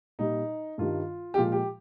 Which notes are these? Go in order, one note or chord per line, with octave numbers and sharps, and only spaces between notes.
A#2 G3 D#4
G2 D#3 G3 F4
G4
A#2 F3 G#3 F4
G4